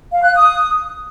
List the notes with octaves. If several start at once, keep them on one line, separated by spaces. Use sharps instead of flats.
F5
F#6
D#6